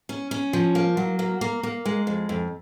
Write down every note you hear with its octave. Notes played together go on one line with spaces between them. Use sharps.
C#4
C#4
F3
A#3
F#3
A#3
A#3
A#3
G#3
F2
F2